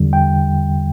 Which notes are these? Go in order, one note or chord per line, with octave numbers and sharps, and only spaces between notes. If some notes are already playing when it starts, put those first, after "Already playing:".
Already playing: E2 D3 G3
G5